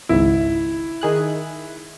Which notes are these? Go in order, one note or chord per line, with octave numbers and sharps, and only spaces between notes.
G#1 C#2 G#2 E4
D#3 G#4 F#6